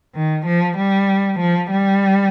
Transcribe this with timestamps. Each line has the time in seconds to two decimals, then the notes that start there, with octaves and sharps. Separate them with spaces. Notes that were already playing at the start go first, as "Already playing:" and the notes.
0.15 D#3
0.46 F3
0.77 G3
1.39 F3
1.70 G3